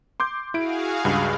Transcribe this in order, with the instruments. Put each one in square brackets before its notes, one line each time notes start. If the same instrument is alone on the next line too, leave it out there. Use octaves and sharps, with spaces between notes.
[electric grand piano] C6 D6 G6
[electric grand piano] E4 D7 [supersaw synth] F#4 G#4 F5
[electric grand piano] C#2 G2